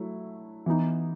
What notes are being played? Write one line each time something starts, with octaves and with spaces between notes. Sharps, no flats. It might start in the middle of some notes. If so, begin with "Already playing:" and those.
Already playing: F#3 A3 E4
E3 B3 D#4